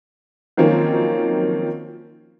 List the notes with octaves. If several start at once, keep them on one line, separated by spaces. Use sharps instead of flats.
D#3 F3 F#3 A#3 C4 C#4